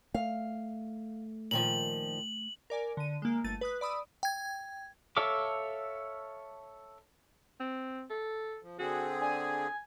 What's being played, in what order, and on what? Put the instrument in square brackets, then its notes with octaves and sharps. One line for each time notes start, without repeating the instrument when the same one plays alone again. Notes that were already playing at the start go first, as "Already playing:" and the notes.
[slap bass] A3 [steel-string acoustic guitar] F5
[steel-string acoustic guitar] A#2 D#3 F3 [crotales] F#7
[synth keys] A#4 D5 G#5
D3 D#7
G#3 A#3
G1 A3 A6 D#7
B4 D#6 F#6
D5 B5 D#6 E6
[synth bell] G5 G#6
[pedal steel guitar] A4 C#5 E5 F5 D6
[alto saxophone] C4
A4
[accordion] F3
[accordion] D3 C4 G#4 [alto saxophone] F#4
[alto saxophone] D4 [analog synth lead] G#5